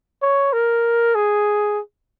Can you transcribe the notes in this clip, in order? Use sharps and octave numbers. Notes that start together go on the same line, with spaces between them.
C#5
A#4
G#4